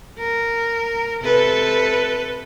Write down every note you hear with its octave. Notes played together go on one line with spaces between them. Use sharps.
A#4
C3 A4 B4